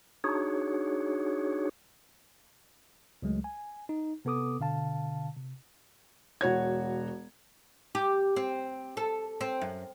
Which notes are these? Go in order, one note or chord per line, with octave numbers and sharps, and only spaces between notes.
D4 D#4 F#4 G#4 C#5
C#2 F#3 G#3 A3
G#5
D#4
C3 B3 A4 D6 D#6
B2 D3 F5 A5
C3
E1 F#4 C#5 G#6
G4
C4
A4
C4
F#2